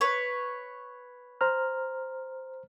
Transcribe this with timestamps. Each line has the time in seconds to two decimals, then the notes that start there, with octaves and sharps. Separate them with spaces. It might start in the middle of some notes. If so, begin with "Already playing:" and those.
0.01 B4 C#5
1.41 C5 A#5 F6